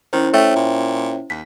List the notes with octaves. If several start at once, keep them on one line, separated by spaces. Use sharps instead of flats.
D#3 C#4 E4 C5
A3 C#5 E5 G5
A#2
D#2 B6